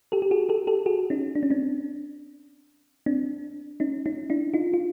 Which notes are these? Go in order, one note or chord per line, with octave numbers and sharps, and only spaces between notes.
G4 A4
G4
F#4 G#4
G4 A4
G4 A4
F#4 G#4
C#4 D#4
D4
C#4
C4 D4
C4 D4
C#4 D#4
C#4 D#4
D4 E4
D#4 F4
F4